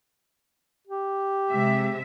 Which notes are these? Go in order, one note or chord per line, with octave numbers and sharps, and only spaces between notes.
G4
C3 G#3 E5